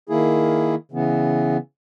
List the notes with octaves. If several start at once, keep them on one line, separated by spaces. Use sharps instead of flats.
D#3 A#3 E4 G#4
C#3 E3 B3